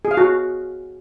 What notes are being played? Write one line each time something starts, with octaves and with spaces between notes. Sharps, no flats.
G#4
F5
F#4